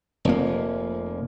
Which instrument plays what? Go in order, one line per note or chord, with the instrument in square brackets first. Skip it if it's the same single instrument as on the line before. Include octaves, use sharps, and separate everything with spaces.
[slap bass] F1 F2 A#3